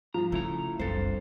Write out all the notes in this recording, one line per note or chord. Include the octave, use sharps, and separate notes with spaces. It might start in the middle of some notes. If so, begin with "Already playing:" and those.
G2 F3 A#5
C#3 A3 E4 A#5
F#1 C2 G2 A4 C5